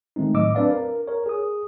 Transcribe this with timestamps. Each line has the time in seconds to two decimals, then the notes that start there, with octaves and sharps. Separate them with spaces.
0.16 D#3 G#3 A3 C4 D#4
0.34 A2 F#3 D#5 D6 E6
0.55 C4 D4 B4 D5 F5
0.71 A#4
1.08 A#4 C#5
1.26 G#4 D#6